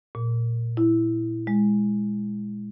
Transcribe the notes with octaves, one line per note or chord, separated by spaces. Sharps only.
A#2
E4
G#3